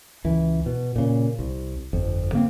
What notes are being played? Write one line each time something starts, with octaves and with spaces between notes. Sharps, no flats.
C#2 E3
B2
A#2 C#3
C2
G1 F2
C#3 A#3 C4